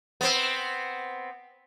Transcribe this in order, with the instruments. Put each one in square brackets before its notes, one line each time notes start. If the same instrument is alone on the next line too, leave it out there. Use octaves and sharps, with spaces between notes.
[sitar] B3 C4